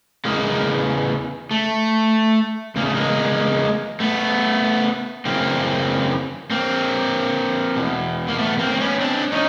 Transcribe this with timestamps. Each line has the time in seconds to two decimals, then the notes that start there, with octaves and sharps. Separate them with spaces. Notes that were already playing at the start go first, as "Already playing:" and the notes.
0.25 E2 C#3 E3 G#3 A#3
1.51 A3
2.76 E2 C#3 A#3
2.85 A3
2.94 G#3 A#3
4.00 A3 B3
5.25 F#2 C#3 E3 A#3 C4
6.51 A#3 C4
7.76 E2 B2
8.28 A#3
8.39 A3 B3
8.59 A#3 C4
8.74 C4
8.80 B3 C#4
9.01 C4 D4
9.32 C#4 D#4